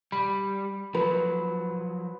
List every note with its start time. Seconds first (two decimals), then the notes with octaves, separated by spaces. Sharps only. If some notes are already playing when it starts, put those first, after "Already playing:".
0.12 G3 B5
0.95 F3 F#3 B4